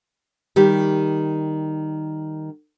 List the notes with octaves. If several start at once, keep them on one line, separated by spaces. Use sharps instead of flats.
D#3 G3 G4